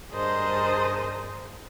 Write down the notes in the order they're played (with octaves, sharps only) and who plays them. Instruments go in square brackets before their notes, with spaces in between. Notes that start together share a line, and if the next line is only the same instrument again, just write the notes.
[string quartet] G2 G#4 A#4 C5 D#5 A5